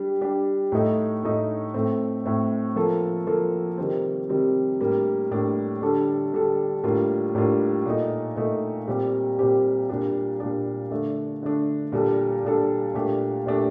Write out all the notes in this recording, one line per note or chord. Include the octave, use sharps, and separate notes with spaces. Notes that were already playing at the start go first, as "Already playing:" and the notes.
Already playing: G3 D4 G4
G3 D4 G4
A2 A3 D#4
A2 A3 D#4
A2 A3 C4
A2 A3 C4
F3 A#3 F4 A4
F3 A#3 F4 A4
C3 D#3 G3 C4
C3 D#3 G3 C4
A2 G3 A#3 D4
A2 G3 A#3 D4
D3 G3 D4 A4
D3 G3 D4 A4
A2 G3 A#3 D4 F4
A2 G3 A#3 D4 F4
A#2 A3 D#4
A#2 A3 D#4
A#2 G3 C4 G4
A#2 G3 C4 G4
A#2 G3 D4
A#2 G3 D4
D3 A3 D4
D3 A3 D4
A#2 G3 D4 A4
A#2 G3 D4 A4
A#2 A3 D4 G4
A#2 A3 D4 G4